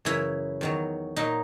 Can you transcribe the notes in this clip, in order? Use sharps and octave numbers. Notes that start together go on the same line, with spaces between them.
F#2 C#3 E3 E4
E2 D#3 F#3
A#2 F#3 D#4